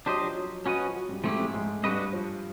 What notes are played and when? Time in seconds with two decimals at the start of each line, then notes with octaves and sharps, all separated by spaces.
0.06 F#3 D4 G4 C5 D#5
0.21 F3
0.35 F#3
0.65 F#3 C#4 F#4 B4 D#5
0.87 F3
0.94 F#3
1.09 G2 G3
1.24 G#2 F3 G#3 A3 C4 E4 G4
1.39 G#2 G#3
1.48 A3
1.54 G#2 G#3
1.83 G2 G3 D4 F#4 B4 D#5
2.13 F3